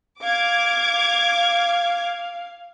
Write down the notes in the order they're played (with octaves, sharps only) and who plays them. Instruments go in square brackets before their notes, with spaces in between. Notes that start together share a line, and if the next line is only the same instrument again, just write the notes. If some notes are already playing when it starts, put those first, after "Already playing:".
[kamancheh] F5 [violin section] D6 G#6